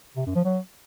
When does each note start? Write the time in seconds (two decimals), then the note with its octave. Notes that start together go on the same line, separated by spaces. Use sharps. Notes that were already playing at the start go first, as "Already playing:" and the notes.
0.17 C3
0.26 F#2
0.35 F3
0.45 F#3